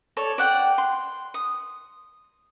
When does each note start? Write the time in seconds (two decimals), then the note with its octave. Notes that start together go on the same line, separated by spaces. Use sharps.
0.17 A4 C#5 D5
0.38 D5 F#5 G5
0.78 C6
1.34 D#6